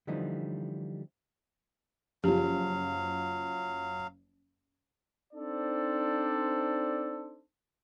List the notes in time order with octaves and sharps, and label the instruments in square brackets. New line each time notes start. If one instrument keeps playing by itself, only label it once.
[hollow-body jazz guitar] D3 E3 F3 G3 A3 D#4
[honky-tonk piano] F#1 F3 [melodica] F#3 F5 [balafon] G4
[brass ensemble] C4 D4 D#4 A4 C5 D5